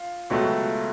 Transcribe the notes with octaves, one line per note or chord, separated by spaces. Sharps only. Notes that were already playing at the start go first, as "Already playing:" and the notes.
Already playing: F4
C#2 B2 F#3 A3